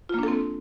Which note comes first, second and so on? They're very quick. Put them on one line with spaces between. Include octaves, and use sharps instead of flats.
F4 A#3 D4 A4 C4